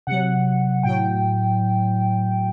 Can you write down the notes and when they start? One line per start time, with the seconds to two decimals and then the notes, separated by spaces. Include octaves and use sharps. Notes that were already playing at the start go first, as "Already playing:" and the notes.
0.07 C3 F#3 F#5
0.83 A2 F#3 G5